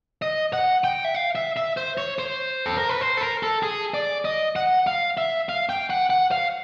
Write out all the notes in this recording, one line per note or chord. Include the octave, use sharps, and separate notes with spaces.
D#5
F#5
G5
E5
F5
E5
E5
C5
C#5
C5
A4
A#4
B4
C5
A4
A#4
A4
G#4
D5
D#5
F#5
F5
E5
F5
G5
F#5
F#5
F5